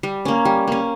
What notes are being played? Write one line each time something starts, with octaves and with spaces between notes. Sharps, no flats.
G3
A#3 C#4
G3
A#3 C#4